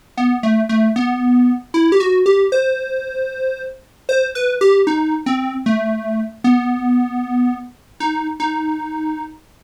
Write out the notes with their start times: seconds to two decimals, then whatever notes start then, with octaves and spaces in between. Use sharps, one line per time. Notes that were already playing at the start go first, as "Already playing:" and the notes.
0.17 B3
0.43 A3
0.69 A3
0.96 B3
1.74 E4
1.92 G4
2.00 F#4
2.26 G4
2.52 C5
4.09 C5
4.35 B4
4.61 G4
4.87 D#4
5.26 C4
5.66 A3
6.44 B3
8.00 D#4
8.40 D#4